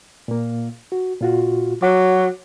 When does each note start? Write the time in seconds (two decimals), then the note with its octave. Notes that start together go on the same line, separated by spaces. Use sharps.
0.28 A#2 A#3
0.92 F#4
1.21 A#2 F4 F#4
1.82 F#3 F#5 D6